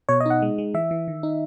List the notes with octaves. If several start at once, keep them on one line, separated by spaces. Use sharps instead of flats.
B2 C#5
D#5
D#4 F#5
G#3
G#3
E3 E5
E3
D#3
D#4